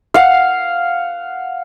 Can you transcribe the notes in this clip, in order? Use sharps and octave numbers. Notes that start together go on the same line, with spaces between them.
F5 F#5